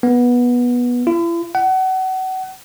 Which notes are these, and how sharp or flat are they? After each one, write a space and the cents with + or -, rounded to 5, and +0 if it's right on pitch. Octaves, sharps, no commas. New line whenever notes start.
B3 -15
E4 +45
F#5 +30